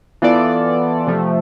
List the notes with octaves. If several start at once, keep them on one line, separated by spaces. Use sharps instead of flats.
E3 B3 F4 A4 D5
C3 F3 A3